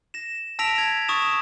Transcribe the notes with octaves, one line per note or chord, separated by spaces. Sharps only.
A#6 E7
A5 E6 A#6 B6 D7 F7
G#6 A#6
C#6 D#6 A6 E7